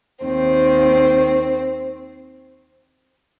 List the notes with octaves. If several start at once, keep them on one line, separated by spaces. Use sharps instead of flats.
D#2 D#3 C4